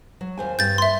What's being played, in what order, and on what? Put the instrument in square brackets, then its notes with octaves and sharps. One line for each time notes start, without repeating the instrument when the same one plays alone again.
[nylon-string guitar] F#3
D#2 C5 G#5
[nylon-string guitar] G2 [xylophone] G6 A6
[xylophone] E5 C6